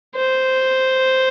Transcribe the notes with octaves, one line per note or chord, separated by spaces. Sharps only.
C5